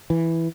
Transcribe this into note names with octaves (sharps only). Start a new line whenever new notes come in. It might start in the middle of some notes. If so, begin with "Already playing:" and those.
E3